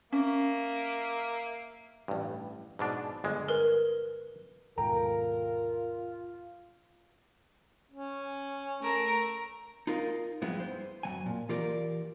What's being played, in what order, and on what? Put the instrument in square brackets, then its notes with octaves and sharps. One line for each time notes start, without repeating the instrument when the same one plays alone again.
[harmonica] A#3 E5 [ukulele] C#4
[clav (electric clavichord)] A1 G2
G#2 B2 D4
G1 G#3
[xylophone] A#4 B4
[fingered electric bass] D#2 G#2 B2 [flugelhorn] F4 [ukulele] A4 G5 A#5 [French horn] A#4
[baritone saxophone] C#4
[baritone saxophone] A3 [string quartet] A#4
[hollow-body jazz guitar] D#4 F4 A#4 D#5
G2 F3 G#3 B3 E4
C5
F#2 F#3 G#5
A#2
E3 F4 G4 A#4 D5